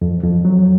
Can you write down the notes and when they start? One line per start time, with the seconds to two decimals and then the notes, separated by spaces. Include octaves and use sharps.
0.02 F2
0.23 F2
0.45 F#3